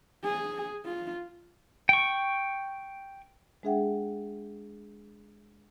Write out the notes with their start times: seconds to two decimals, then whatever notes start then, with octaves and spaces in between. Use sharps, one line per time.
0.24 G#4
0.85 F4
1.89 G5 C#6
3.63 G#3 D4 G#4 E5 F#5 G5